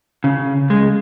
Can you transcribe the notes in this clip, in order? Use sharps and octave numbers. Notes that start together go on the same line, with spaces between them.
C#3
G#3